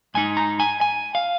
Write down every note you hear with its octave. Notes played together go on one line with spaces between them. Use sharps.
G#2 G#3 D#4 G#5
A#5
G#5
G#5
F5